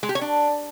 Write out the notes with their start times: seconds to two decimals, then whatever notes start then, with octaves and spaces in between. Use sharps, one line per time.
0.03 G#3
0.09 G4
0.15 C#5
0.21 D4